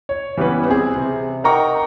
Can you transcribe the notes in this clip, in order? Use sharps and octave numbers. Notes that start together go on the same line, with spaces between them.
C#5
E3 G3 B3 C#4 B4
C4 G#4
C3
D#4 A#4 F#5 G5 A#5 C#6